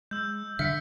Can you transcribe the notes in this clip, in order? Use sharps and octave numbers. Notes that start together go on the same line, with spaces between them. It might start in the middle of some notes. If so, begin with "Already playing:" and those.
G#3 E6 G6
D3 G3 E5 F6 B6 C#7